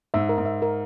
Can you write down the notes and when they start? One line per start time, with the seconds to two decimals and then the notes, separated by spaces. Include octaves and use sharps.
0.14 G#2 E5
0.29 A#4
0.38 G#2
0.46 E5
0.62 A#4